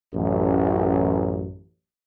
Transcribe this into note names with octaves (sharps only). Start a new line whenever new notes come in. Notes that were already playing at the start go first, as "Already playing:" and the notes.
A1 F#2